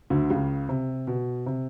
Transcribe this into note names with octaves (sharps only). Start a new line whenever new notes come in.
D2 D3
C#2 C#3
C3
B2
C3